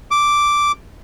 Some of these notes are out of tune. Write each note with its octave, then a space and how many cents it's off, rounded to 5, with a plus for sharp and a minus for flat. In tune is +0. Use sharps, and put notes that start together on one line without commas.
D6 -5